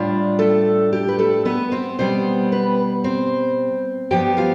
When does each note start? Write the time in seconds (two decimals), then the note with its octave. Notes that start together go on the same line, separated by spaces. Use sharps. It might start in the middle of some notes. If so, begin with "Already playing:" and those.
Already playing: A2 G3 D4 F4 D5
0.39 A3 A4
0.93 G4
1.08 B4
1.19 A3 A4
1.45 B3 B4
1.72 C4 C5
1.99 B2 G3 B3 C4 C5
2.52 B3 B4
3.04 C4 C5
4.11 G2 F3 B3 G4 G5
4.37 F4 F5